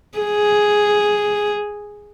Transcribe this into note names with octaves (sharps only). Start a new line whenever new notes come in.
G#4